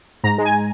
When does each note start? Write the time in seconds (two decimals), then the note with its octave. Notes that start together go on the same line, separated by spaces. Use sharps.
0.24 G#2 A#5
0.38 G#3
0.45 G#5